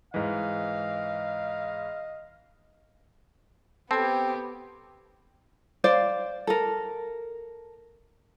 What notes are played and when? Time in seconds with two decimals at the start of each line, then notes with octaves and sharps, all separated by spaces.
0.14 G#2 E3 D#5 F5
3.91 B3 C4 G4 A4 G#6
5.84 C5 D5 F5
6.47 A4 A#4